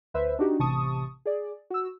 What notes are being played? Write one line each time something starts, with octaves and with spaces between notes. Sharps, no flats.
D2 B4 C5 E5
D4 D#4 F#4 G4
A1 C3 A5 C#6 D#6
G#4 D5
F#4 E6